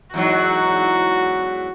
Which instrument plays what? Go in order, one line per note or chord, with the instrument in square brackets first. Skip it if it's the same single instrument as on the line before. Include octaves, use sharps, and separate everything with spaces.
[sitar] E2 G#2 F#3 [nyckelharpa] F#4